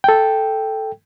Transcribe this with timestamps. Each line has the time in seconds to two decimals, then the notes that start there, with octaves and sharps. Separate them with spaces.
0.04 A4 G5